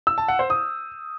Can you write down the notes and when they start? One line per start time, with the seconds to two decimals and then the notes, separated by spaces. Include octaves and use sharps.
0.07 E6
0.18 A5
0.28 F#5
0.39 C5
0.50 D#6